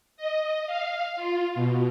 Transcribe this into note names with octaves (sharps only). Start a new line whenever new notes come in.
D#5
F5
F4
B2